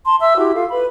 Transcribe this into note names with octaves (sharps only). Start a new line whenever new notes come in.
A5 C6
E5 E6
E4 F#4 G4
F4 A4 F5
B4 B5